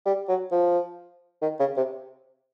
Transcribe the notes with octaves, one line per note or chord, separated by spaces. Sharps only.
G3
F#3
F3
D#3
C#3
C3